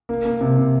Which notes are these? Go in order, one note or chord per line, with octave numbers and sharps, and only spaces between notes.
A#3
A#3
C3
C3